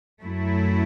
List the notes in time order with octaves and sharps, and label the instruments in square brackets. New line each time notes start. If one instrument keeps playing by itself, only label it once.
[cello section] F#2 F#3 A3 E4